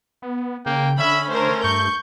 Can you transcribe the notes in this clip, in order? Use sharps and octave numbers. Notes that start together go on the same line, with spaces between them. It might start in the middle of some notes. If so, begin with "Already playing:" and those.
B3
C#3 A#3 G5
D3 C#4 E5 B5
A3 A#4 C5
G2 C#6 G6